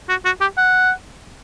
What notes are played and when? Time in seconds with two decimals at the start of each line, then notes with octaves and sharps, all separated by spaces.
0.09 F#4
0.25 F#4
0.41 G4
0.57 F#5